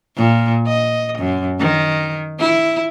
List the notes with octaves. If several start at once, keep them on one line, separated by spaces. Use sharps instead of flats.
A#2
D#5
F#2
D#3
E4